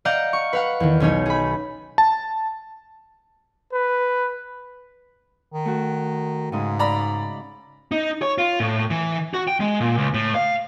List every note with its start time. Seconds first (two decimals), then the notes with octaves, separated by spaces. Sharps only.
0.05 D5 D#5 F5 F#5 A#5 G6
0.33 C#6
0.53 B4 F5 F#5
0.80 E2 D#3
1.00 B1 C#4 D#4 C#5
1.26 G#4 B5
1.98 A5
3.73 B4
5.53 D#3
5.65 A3 F#4
6.52 G#2 C#3 G#3 D#5
6.79 D5 A#5 B5
7.92 D#4
8.22 C#5
8.38 F4
8.60 A2
8.90 E3
9.34 F#4
9.48 G5
9.60 G#3
9.80 A#2
9.98 C#2
10.14 A2
10.35 F5